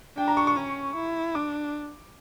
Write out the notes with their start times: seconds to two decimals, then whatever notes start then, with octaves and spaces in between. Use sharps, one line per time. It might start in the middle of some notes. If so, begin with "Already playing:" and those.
0.17 D4 G5
0.27 A#5
0.37 C#6
0.47 C#6
0.57 C#4
0.95 E4
1.35 D4 D6